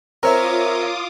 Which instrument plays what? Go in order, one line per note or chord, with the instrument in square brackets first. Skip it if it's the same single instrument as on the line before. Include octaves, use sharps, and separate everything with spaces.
[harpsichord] C4 [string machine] F4 D6 D#6 [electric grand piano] A#4 C#5 E5 [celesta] A#5